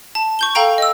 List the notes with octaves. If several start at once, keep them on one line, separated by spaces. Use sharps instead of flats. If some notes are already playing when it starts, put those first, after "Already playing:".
A5
C#6 G6 G7
A4 F5 G5 A#5 D7
D#5 E6